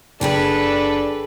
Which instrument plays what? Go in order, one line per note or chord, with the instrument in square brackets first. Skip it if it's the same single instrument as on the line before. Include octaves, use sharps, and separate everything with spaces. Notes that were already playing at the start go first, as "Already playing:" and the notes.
[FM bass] F#1 [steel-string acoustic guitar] D3 G#4 G5 [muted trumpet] D4 [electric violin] A4 B4